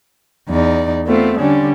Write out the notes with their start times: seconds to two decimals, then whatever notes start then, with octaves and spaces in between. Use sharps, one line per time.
0.49 E2 D#4 D5
1.06 A3 B3 C4 F4
1.39 D3 G3 C#4 D4